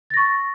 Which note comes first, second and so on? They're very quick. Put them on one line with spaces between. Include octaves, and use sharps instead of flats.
A6 A#6 C#6